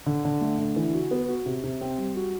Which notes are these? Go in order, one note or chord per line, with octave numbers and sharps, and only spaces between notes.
D3
D3
A3
D3
E3
F#4
B3
F#4
C3
C3
C4
G3
F#4